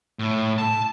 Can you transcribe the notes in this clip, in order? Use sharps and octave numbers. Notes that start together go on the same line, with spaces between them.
A2
A5